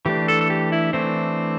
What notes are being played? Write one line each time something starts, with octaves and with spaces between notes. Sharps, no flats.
E3 A3 D4 G4
A4
A4
G4
E4
E3 A3 C4 D4